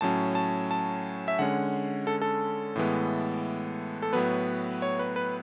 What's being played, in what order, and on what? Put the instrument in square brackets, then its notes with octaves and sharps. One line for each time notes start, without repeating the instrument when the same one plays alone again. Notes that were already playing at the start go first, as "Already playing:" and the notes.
[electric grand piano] A2 F#3 C#4 A5
A5
A5
E5
D3 G#3 C#4 F#5
A4
A4
A2 E3 G#3 B3
A4
A2 F#3 B3 B4
C#5
B4
B4